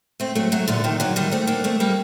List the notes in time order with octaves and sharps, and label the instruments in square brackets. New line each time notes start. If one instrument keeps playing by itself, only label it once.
[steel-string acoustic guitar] A3 C4
F#3 A3
F#3 A3
A#2 D3
C3 D#3
D3 F#3
D#3 G3
A3 C4
A#3 D4
A3 C4
G3 A#3